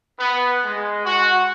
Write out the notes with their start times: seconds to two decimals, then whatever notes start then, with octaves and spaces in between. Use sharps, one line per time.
0.19 B3
0.64 G#3
1.04 F#4